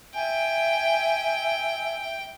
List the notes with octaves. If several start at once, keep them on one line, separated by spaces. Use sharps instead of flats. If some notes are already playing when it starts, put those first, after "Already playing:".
E5 G5 G#5